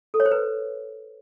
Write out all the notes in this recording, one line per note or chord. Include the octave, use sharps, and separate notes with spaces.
A4
C#5
C5
B4